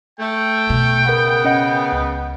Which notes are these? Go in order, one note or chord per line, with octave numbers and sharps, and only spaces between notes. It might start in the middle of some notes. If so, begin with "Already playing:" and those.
A3 G5
B2
C#3 B3 A#4 F#5
C#4 D#5 F#5
C#2